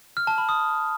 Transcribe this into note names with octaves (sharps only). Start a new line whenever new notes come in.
F6
A5
B5
D#6